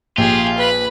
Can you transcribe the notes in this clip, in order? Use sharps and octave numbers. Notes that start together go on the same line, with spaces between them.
A#1 F4 G4 G#4
B4 B5